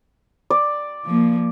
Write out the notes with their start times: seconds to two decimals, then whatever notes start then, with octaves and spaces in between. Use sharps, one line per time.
0.50 D5
1.06 F3 A#3